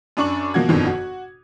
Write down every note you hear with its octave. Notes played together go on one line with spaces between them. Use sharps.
F#2 D4 D5 C#6 F#7
B2 F3 A#3 F#4 G#6
G1 F2 B2 D3 D#3 F3
F#4